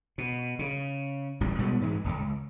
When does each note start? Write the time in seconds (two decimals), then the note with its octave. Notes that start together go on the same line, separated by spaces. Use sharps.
0.18 B2
0.59 C#3
1.40 D1 A1 A#2 G3
1.59 B2 G3 G#3 B3
1.81 G#2 E3 G3 G#3
2.04 D1 C#2